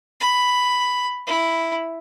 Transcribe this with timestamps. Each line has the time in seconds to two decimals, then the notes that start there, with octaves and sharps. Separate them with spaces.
0.20 B5
1.27 E4